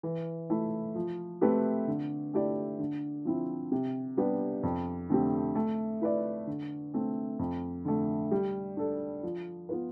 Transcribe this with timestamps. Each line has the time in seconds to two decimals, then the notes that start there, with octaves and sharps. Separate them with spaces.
0.03 E3
0.50 A3 E4
0.95 F3
1.41 A3 C4 G4 B4
1.88 D3
2.34 A3 E4 G4 D5
2.79 D3
3.25 F3 C4 E4
3.72 C3
4.17 G3 B3 D4 G4
4.63 F2
5.10 D3 A3 C4 G4
5.55 A3
6.01 E4 B4 D5
6.47 D3
6.94 A3 C4
7.39 F2
7.85 D3 A3
8.31 G3
8.77 D4 A4
9.23 F3
9.69 B3 F4 B4